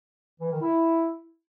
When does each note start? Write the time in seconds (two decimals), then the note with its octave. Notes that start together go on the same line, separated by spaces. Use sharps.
0.40 E3
0.51 D#3
0.61 E4